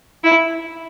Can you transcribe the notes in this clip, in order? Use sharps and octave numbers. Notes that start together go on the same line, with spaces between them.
E4